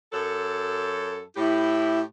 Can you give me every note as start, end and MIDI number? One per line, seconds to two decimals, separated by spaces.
0.13 1.22 42
0.13 1.22 54
0.13 1.22 69
1.37 2.02 45
1.37 2.01 64
1.37 2.02 67